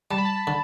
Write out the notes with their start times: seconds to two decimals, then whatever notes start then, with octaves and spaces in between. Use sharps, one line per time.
0.11 G3 A5
0.18 B5
0.25 A5
0.47 D3